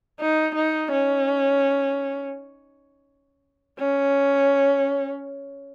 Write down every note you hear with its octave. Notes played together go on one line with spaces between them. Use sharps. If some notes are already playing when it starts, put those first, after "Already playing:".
D#4
D#4
C#4
C#4